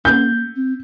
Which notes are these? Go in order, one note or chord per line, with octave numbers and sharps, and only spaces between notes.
A#3 G6
C4